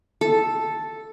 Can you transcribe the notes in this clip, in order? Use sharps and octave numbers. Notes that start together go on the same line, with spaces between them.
A4